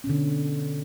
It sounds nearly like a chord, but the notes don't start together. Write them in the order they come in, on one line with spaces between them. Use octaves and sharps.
C#4 B2 D3